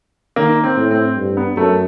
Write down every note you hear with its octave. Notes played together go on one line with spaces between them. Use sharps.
D#3 A#3
C4
A2
C4
G2
B3
F#2 A3